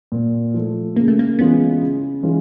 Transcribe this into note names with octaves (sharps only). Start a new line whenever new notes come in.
A#2
F3 A3
C#3 A#3
A3
A#3
E3 G#3 B3 C#4 F4
C#3
E3 G#3 C#4 F4